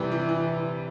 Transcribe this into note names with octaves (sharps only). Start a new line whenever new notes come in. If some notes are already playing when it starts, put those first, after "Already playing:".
Already playing: C3 E3 G3
E3
E3